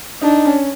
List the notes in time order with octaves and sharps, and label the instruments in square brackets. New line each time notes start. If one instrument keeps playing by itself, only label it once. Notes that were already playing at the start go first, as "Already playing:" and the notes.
[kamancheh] D4 [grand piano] D#4
[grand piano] C#4